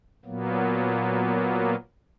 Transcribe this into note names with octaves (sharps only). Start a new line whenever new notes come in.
A#2 F#3 A#3 B3